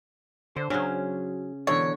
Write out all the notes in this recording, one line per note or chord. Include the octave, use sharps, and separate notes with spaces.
D3 C5
C#3 F#3 C#4 D4 C5
B2 D3 E3 A#4 C#5